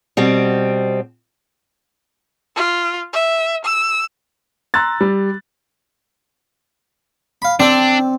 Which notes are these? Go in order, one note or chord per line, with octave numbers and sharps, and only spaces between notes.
B2 G3 C4
F4
E5
E6
A#5 C6 E6 F#6 A6
G3
F5 B5
C4 D4 A4 D5